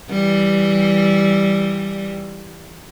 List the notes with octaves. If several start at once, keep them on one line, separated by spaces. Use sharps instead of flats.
E3 G3